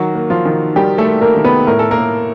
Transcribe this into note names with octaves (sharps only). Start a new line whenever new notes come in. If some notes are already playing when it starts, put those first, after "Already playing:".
Already playing: D#3 F#3 F#4
A#3
F3 F4
D#3
D#3 G3 G4
A3 A4
A#3
A#3 A#4
D#3
B3 B4
A2 A#4
A4
A#3 A#4
A2